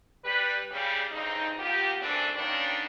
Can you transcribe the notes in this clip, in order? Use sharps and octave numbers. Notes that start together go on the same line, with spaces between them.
G3 B4
C#3 G3
G2 C#3 C4 D#4
A#3 B3 F4 G4
F#2 E3 A3 C4 D4
D#3 G3 A#3 B3 C#4 D4